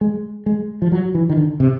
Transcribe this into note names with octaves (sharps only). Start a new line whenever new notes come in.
G#3
G#3
F3
F#3
E3
D#3
D3
C3